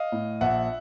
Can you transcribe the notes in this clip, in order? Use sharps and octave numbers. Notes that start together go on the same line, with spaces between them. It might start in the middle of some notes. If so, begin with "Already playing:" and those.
Already playing: D#5 F5
A2
A#1 E5 F#5